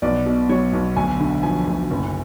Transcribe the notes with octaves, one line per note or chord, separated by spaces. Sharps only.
B1 D5
B2
F#3 C#5
B1
D2 G#5
D3
F3 G#5
D2
F#1